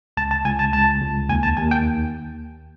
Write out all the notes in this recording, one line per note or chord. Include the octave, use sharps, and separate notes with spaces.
C#2 A5
A5
C#2 G#5
A5
C#2 A5
C#2
D#2 G#5
A5
D#2 G#5
G5